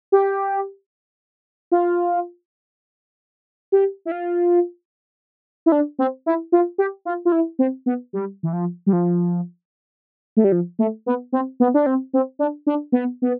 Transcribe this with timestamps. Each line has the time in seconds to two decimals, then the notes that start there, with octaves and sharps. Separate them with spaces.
0.12 G4
1.72 F4
3.72 G4
4.05 E4
4.12 F4
5.66 E4
5.72 D4
5.99 C4
6.26 E4
6.52 F4
6.78 G4
7.05 F4
7.25 F4
7.32 E4
7.59 C4
7.86 B3
8.13 G3
8.43 E3
8.53 F3
8.86 G3
8.93 F3
10.37 A3
10.44 G3
10.52 F3
10.79 A3
11.06 B3
11.33 C4
11.60 B3
11.74 D4
11.86 C4
12.13 C4
12.39 D4
12.67 D4
12.92 B3
13.22 B3